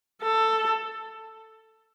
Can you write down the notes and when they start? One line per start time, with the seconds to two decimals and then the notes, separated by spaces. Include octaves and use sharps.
0.22 A4